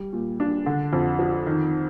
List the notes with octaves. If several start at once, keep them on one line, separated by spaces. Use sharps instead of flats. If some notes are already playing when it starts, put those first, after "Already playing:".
Already playing: G3
A#2
D4
D3
F2
F3
D#3